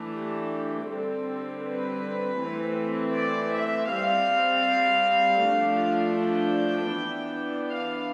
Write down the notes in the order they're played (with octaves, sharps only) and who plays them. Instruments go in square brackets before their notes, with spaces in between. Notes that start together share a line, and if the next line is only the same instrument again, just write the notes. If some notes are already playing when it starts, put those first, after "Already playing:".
Already playing: [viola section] E3 A3 D4
G4
D3 G3 C4 A4
B4
E3 A3 C4
D5
E5
G3 C4 F5
F3 A3 D4
G5
E3 B3 D4
F5